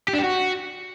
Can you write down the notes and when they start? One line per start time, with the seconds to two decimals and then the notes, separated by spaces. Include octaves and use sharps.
0.08 G4
0.13 D4
0.18 G4
0.24 F#4